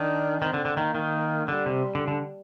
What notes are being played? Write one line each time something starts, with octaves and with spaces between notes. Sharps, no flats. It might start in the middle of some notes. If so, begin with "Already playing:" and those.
Already playing: D#3 D4
D#3 C4
D3
D3
D#3 A#3
D#3
D3 G3
C3
D3
D3